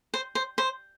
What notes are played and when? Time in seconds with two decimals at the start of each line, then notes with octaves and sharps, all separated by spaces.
0.14 C5
0.35 C5
0.58 C5